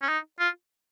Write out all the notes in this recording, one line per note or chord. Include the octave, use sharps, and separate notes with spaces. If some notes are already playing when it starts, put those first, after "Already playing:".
C#4
D#4
F4